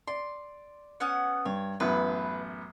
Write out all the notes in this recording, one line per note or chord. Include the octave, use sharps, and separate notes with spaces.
D5 C6
B3 C#4 F#5
G2 C#5
A1 F#2 B3 B4